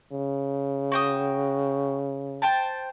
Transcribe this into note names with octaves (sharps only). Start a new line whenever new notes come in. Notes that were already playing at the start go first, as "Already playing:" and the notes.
C#3
F#4 G5 D#6
C5 G5 A5